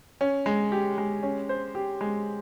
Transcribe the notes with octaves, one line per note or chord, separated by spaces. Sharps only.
C#4
G#3
G4
G#3
C#4
C5
G4
G#3